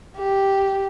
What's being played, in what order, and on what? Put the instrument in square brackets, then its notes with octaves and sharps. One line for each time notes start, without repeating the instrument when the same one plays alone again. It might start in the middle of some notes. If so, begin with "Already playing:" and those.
[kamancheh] G4